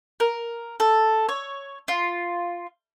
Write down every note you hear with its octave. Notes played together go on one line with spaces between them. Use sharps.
A#4
A4
C#5
F4